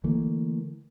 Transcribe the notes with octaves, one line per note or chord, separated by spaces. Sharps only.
D3 E3 A3 A#3